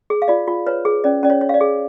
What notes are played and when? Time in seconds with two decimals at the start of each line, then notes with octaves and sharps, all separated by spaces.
0.10 G#4
0.22 F5
0.28 F4 D5
0.47 F4
0.67 B4 C#5
0.85 G#4
1.04 C#4 D5
1.23 C#4 D5
1.30 C#5
1.41 C#5
1.49 F5
1.54 D5
1.61 G#4